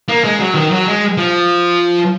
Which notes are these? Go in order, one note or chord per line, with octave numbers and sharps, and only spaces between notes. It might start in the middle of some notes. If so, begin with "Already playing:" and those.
A#3
G#3
F#3
D#3
F#3
G#3
F3